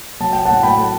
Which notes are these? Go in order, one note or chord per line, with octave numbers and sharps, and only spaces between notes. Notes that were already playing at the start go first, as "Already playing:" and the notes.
F#3 A5
F#3 G5
A2 F#5 A5
F#3 G5 B5
A3